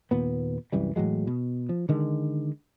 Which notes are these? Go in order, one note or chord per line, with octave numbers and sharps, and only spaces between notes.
D#2 A#2 B3
C2 F#2 E3 G3
A2 E3 F#3 G#3
B2
F3
D3 D#3 G#3